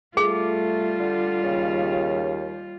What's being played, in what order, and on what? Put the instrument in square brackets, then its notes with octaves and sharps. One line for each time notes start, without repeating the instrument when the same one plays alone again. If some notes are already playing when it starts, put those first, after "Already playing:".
[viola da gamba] G3 F4 [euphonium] A3 [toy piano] G#4
[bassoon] D3
[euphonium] D#2 [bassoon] C#3